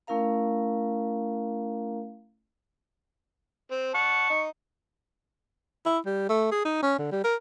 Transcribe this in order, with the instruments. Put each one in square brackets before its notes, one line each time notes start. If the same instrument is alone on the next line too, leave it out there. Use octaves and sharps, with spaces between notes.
[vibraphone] A3 C#4 E4 A#4 F5 A#5
[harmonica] C4
[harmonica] F#5 A5 [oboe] C#6
[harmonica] D#4
[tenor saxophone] E4
G3
A3
G#4
D#4
C#4
D3
G3
A#4